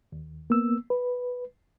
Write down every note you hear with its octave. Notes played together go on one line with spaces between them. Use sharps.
D#2
A#3 B3 E6
B4